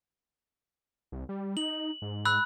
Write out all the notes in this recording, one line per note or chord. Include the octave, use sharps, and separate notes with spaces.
C2
G3
D#4 F#7
G#2
B5 E6 F#6